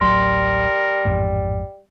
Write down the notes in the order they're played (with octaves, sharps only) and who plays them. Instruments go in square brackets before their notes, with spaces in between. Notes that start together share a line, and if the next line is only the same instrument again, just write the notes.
[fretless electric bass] D1 A1 F#3 [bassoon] G3 [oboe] A#4 [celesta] C6
[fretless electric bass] A1 F2 G#2